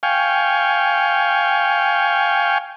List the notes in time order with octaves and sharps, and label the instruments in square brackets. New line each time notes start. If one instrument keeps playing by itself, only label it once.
[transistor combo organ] F5 G5 G#5 C#6